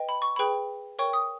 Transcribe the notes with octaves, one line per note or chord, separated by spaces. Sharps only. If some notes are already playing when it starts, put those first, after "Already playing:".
Already playing: B4 D#5 G5
B5
C#6
G#4 B4 G5 B5
A#4 C#5 G5 C#6
D#6